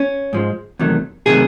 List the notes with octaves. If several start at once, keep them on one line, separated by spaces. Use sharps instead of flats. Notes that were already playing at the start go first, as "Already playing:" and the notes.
Already playing: C#4
G#2 F3 G#3
E2 C3 D#3 F#3 A3
C3 D#3 F#3 A3 G#4